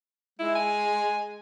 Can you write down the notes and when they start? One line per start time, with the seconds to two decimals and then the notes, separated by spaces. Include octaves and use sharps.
0.39 G#3 E4
0.55 G#5